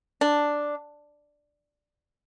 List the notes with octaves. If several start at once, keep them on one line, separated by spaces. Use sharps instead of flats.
D4